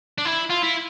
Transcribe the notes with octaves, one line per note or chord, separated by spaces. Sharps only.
D4
E4
F4
E4